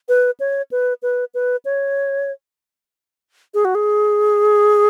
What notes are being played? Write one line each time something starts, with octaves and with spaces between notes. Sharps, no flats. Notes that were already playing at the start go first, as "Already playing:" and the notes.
B4
C#5
B4
B4
B4
C#5
G#4
F#4
G#4